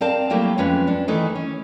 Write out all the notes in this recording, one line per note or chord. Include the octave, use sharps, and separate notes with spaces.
C4 A#4 D5 F5 G5 A5
F#3 G3 A3 A#3 E4 G4
F2 G#3 C#4 B4
C#4 D4
D#3 E3 A3 D#5
C#4